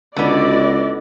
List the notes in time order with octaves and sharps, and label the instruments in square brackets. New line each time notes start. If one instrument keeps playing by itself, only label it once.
[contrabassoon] C#2 [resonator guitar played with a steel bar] D3 B3 [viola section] E4 F#4 D5 [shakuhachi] D#5